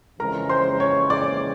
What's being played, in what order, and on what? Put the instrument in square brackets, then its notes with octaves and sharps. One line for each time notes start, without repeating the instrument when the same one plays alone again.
[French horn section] F2 C#3 E3 G#3 [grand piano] A#4 A#5
[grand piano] C5 C6
C#5 C#6
D5 D6